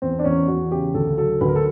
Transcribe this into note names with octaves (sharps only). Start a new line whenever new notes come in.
E2 C4
D4
E2 C#4
E2 F#4
C#3 G4
D2 A4
F#3 A4
D2 B4
A#4
A4